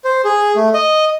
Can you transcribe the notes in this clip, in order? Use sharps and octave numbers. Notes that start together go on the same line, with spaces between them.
C5
G#4
A3
D#5